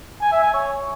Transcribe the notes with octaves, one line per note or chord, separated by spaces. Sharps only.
G#5
E5
G#5
C#5